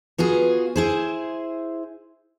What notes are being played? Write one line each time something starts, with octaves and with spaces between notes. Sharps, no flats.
B3 F4 F#4 G#4
E4 G#4 C5